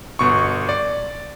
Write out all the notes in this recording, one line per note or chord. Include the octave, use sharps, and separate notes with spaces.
G1 B2 C#6
D5